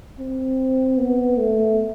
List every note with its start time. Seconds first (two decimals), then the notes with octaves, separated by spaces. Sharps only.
0.19 C4
0.98 B3
1.38 A3